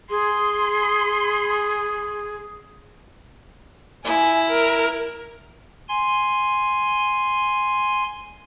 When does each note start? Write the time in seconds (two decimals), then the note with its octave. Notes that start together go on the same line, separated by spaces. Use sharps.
0.10 G#4 C6
4.05 E4 G#5
4.49 A#4
5.89 G#5 C6